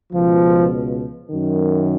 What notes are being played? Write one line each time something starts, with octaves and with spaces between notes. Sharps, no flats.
C#2 B2 F3
F#2 D#3